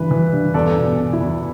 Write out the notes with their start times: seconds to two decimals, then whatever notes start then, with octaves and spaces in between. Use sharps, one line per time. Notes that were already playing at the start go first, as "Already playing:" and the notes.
Already playing: G2 E3 B4
0.11 E3
0.33 G2
0.54 E2 A4 D5
0.77 B2
0.99 B2
1.13 E4
1.20 E2